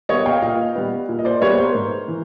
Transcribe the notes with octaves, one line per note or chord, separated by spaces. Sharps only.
G3 B3 C#5 D#5
F5 G5
A#2 D#5 F5
G3 B3
A#2
D#5
C5 D5
G3 B3 B4 C#5
A#4 C5
G#2
E3